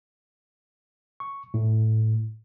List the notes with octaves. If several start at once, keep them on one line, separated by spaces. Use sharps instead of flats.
C#6
A2